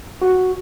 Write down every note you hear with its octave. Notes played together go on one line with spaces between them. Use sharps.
F#4